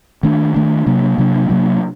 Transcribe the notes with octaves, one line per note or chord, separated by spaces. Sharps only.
D#3 A3 D4
D#3 A3 D4
C3 F#3 A#3 D4
C3 F#3 A#3 D4
C3 F#3 A#3 D4